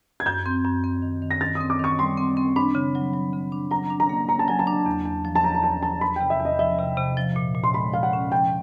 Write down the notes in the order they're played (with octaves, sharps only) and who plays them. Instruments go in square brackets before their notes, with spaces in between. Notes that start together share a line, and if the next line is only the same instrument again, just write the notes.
[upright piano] G#6
[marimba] F#2 [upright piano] G6
[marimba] C4
F#2
C4
D#3
D#3
[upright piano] A#6
[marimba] D#3 [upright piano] A6
[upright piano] D#6
[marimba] C4
[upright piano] D6
[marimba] D#3 [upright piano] C#6
[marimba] G3 [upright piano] C6
[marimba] C4
C4
[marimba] D4 [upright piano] B5
[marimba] C#3
F#3
F#3
C#3
D4
[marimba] F#3 [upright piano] A#5
[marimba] D4
[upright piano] A#5
[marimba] A#3
[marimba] A#3 [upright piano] A#5
[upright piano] A5
[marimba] F#3 [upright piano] G#5
[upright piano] A5
[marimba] D4
E2
E2
F3
[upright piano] A5
[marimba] E2 [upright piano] A#5
[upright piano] A#5
[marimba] E2 [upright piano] A5
[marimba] F3 [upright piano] A5
[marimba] E2 [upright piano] B5
[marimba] C3 [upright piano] G5
[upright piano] E5
[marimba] E2
[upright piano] D#5
[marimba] F3 [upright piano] E5
[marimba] C3
C3
F3
A#2
A#2
[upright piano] C6
[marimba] G#3 [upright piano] B5
[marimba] F3 [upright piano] F5
[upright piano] F#5
[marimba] C#4
[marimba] F3 [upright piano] G5